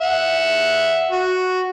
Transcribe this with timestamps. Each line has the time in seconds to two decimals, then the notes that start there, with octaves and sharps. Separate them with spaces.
0.01 E5 F#5
1.11 F#4